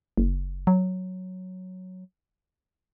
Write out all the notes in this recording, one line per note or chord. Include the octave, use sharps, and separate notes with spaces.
F#1
F#3